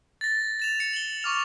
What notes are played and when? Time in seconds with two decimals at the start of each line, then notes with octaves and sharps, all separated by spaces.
0.21 A6 A#6
0.60 A6 E7 F7
0.80 C#7
0.93 F#7 G7
1.23 C#6 D6 F6 F7